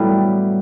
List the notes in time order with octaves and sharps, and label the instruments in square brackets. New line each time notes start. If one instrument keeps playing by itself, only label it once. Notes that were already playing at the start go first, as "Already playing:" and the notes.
Already playing: [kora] A2 F#3 B3 E4 [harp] G3